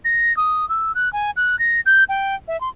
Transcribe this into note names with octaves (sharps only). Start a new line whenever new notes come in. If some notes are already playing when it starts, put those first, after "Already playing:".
A#6
D#6
E6
F#6
G#5
F#6
A#6
G6
G5
E5
C6